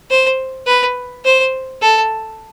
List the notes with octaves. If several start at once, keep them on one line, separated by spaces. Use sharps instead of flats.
C5
B4
C5
A4